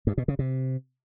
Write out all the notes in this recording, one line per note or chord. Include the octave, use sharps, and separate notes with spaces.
G2
B2
C#3
C3